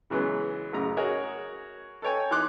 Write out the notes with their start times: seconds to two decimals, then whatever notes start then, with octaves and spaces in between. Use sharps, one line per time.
0.10 C#3 E3 F#3 G#3 B3
0.73 A1 F#2 C#3 A#5
0.97 F#4 G#4 A#4 C#5 D#5
2.02 A4 B4 C#5 G5 G#5
2.31 E3 D#4 C6 D6 F#6